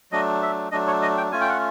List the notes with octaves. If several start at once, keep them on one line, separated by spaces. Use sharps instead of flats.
F#3 A3 D4 D#5
E5
F#3 A3 D4 D#5
C#5
D#5
G5
A3 C#4 F4 G#5
G5
F#5